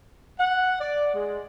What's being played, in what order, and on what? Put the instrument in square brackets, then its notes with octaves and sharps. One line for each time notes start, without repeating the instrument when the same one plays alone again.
[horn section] F#5
D5
G#3